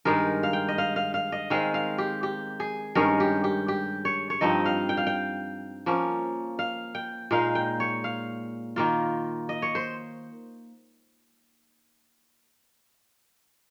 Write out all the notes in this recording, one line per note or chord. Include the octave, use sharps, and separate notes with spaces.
G2 D#3 G#3 D#4 A#4
F5
G5
D#5
F5
F5
F5
D#5
D#3 G#3 C4 F5
F5
G4
G4
G#4
G2 D#3 G#3 C#4 A#4
G4
G4
G4
C#5
C#5
G2 F3 C4 D#4 D#5
F5
G5
F5
G5
F3 A#3 C#4
F5
G5
A#2 G#3 D#4 F5
G5
C#5
F5
D#3 A#3 F4
D#5
C#5
C5